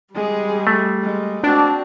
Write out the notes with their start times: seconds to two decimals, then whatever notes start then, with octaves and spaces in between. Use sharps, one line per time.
0.14 G3 G#3 G#4
0.67 A3
1.03 G#3
1.43 C4 D4 F#4